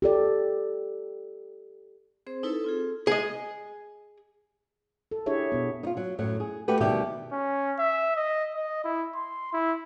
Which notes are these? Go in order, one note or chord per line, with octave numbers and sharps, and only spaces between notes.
G4 A4 D5
C4 G#4 C5
D#4 E4 A4 B4
C4 F4 G#4
G#4 D#5
A4
D4 E4 G4 G#4 C#5 E5
B2 B3
D#4 F4
F#3
F#2 A2 F#3
G#4
A3 F#4 G4 A4 B4
D2 B2 D#3 G3 G4 E5
C#4
E5
D#5
D#5
E4
C6
E4